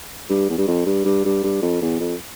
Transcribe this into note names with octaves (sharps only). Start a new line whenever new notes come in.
G2
E2
G2
F2
G2
G2
G2
G2
F2
E2
F2